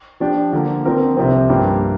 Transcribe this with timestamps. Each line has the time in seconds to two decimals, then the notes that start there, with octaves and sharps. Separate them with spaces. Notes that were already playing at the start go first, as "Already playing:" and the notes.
0.20 F3 D4 G4
0.53 D3 F3 A#3
0.85 D3 F3 C4 A#4
1.17 C2 C3 F3 C4
1.49 G2 F3 A#3 G4